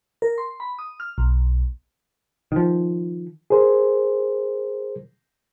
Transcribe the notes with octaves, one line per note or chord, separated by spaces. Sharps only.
A#4
C6
B5
D#6
F6
B1
D#3 F3
G#4 A#4 C5